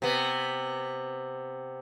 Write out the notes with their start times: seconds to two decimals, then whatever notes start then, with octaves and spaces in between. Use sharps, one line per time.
0.02 C3 B3